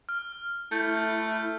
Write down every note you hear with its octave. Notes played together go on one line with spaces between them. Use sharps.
F6
A3 E4 G6